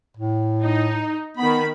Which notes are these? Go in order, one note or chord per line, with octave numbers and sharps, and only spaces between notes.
A2
D#4
D#3 B3 B5